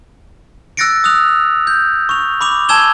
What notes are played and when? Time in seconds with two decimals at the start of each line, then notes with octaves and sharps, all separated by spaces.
0.77 E6 F#6 A6 A#6 C#7 D7
1.04 D#6 E6 F#6 F7
1.67 G6
2.09 C#6 F7
2.41 B5 D6 F7
2.69 G#5 A5 E6 G#6 E7 G7